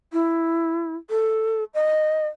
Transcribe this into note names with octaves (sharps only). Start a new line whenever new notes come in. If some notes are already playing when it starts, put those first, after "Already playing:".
E4
A4
D#5